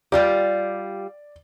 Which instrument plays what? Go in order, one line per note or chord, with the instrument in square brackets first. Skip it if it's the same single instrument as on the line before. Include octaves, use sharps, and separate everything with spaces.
[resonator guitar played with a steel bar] G3 F4 G4 [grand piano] D5